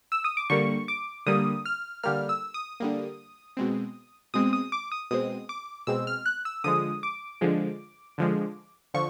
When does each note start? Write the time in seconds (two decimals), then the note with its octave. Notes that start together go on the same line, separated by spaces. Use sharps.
0.12 E6
0.24 D#6
0.37 D6
0.50 D3 G3 A#3 C#6
0.88 D6
1.26 D3 G3 A#3 D#6
1.66 F6
2.03 D3 G3 A#3 F6
2.29 E6
2.54 D#6
2.80 D3 G3 A#3
3.57 B2 G#3 C4
4.34 B2 G#3 C4 D#6
4.53 D#6
4.72 D6
4.92 D#6
5.11 B2 G#3 C4 D#6
5.49 D6
5.87 B2 G#3 C4 E6
6.07 F6
6.26 F#6
6.45 E6
6.64 D3 F3 G#3 D#6
7.03 D6
7.41 D3 F3 G#3
8.18 D3 F3 G#3
8.94 D3 F3 C#6